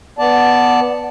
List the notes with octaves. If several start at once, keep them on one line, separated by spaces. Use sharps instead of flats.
B3 D5 A5